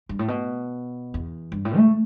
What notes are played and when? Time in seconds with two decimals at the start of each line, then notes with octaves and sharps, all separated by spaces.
0.09 G2
0.19 A2
0.28 B2
1.14 E2
1.52 G2
1.65 A2
1.77 A3